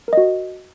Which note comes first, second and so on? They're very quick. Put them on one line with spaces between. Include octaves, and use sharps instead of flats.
A#4 D#5 F#4